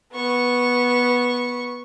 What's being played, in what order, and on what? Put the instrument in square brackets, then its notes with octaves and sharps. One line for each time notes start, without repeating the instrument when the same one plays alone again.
[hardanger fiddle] B3 C#6